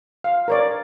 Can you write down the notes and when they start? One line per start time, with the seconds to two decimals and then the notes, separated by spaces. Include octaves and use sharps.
0.24 F5
0.48 A#4 C#5 D5